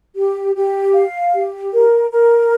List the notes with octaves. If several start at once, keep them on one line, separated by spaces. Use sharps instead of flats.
G4
G4
F5
G4
A#4
A#4